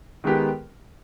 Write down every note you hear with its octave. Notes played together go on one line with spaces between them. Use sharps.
D#3 G#3 B3 G4 A#4